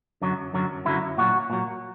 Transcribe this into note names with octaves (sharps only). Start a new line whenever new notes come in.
F#2 D3 F#3
F#2 D3 F#3
F#2 D3 F#3 E4
A#2 F#3 F#4
A#2 F#3